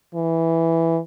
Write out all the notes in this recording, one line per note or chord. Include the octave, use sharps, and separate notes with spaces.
E3